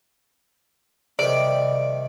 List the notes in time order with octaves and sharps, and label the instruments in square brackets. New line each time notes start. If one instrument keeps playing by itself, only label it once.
[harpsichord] C3 D#3 G3 [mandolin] D5